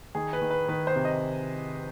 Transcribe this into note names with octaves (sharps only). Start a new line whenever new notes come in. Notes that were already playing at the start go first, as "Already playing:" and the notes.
D#3 G#4
B4
D#3
B4
D#3 B4
C5
C3
D#5